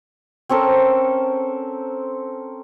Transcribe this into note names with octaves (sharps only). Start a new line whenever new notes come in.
C4 C#4 A4 A#4